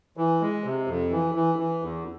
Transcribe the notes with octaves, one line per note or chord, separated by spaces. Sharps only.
E3
G#3
C3
F2
E3
E3
E3
E2